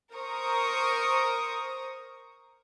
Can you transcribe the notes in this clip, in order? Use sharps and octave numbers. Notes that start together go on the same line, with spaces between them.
A#4 C5 A#5 C#6 D#6